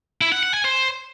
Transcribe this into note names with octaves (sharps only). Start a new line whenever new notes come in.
E4
F#5
F#5
G#5
C5